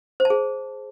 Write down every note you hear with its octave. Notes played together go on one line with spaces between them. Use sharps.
C5
A5
G#4